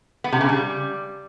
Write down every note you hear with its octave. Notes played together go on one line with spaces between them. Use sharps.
B3
C3
C#3
G3